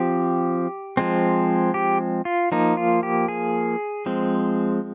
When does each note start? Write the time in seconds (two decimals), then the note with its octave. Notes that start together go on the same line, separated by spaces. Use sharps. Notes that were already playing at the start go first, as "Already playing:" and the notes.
Already playing: F3 C4 G4
0.97 F3 G#3 C4
1.74 G4
2.25 F4
2.52 F3 A#3 D#4
2.77 F4
3.03 G4
3.28 G#4
4.06 F3 G#3 C4